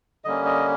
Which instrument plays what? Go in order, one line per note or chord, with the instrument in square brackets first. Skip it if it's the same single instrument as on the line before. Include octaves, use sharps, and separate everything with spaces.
[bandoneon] D3 G3 A#3 C#4 D#5
D#5